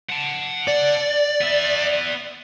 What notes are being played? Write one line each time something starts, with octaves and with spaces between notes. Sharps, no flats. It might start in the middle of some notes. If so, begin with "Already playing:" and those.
F#5 A5
D5
B3 E5